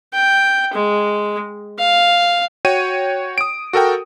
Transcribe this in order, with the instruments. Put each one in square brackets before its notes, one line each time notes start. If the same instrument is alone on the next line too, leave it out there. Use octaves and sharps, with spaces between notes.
[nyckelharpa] G5
G#3
F5
[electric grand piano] F#4 C#5 G5 D#7
D#6 D7
F#4 A4 A#4 G5